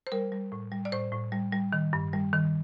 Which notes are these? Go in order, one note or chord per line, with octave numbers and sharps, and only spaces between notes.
C5
G3 A#4
G3
A2
G3
D5
A2 C5
A2
G3
G3
D#3
G2
G3
D#3